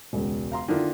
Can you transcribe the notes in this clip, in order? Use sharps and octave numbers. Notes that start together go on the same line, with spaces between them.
E1 C#2
F5 A#5 C6
D3 D#3 A#3 D4 E4 F4